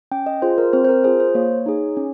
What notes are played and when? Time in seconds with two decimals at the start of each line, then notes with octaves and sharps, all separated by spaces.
0.12 C#4 G5
0.26 D#5
0.42 F4 G#4 C5
0.58 A#4
0.73 C4 C5
0.84 C5
0.89 A#4
1.04 F4 G#4 C5
1.20 C5
1.35 A#3 C#5
1.66 D#4 G#4
1.97 C#4